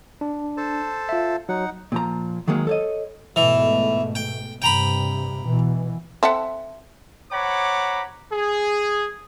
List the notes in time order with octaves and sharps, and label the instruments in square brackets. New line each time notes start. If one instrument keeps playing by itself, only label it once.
[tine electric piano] D4
[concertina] A4 C5 A5
[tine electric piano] F4 E5
[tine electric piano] F#3 [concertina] D#4 F#5
[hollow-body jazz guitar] A#2 F3 A#5
D#3 F#3 G#3 A#3
A4 C#5 D#5
[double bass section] G#2 B2 A3 [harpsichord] E3
[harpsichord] G5
[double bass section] G2 C3 [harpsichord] G5 A#5 B5
[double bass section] B2 E3
[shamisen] C4 A4 [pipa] E5 F#5
[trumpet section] C5 C#5 F#5 A#5 B5 D6
G#4